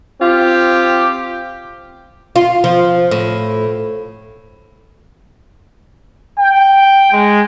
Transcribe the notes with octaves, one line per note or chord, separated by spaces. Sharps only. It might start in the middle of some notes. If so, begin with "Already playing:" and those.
C4 F4 G4
F4
F3
A2
G5
G#3